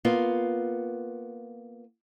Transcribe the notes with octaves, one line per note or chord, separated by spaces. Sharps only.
A#3 B3 F4